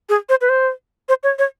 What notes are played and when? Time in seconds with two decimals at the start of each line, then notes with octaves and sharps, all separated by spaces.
0.09 G#4
0.29 C5
0.41 B4
0.49 C5
1.09 C5
1.23 C#5
1.39 C#5